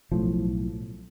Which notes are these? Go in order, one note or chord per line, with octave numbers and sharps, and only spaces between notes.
B1 A2 F3